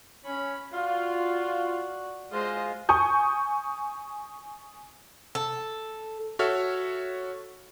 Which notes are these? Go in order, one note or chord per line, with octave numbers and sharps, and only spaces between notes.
C#4 B5
F4 F#4 D5
G#3 F4 C5 D#5
G#5 C#6 D#6 G6
A4
F#4 A4 C#5 E5 F6